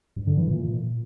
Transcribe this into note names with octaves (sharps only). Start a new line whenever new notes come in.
G2
D3
E3
A#2